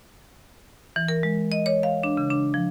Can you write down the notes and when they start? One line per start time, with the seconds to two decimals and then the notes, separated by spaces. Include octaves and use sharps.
0.96 E3
1.08 A#4
1.23 G#3
1.52 D#5
1.66 C#5
1.83 F5
2.03 D4
2.17 C#3
2.30 D4
2.54 F3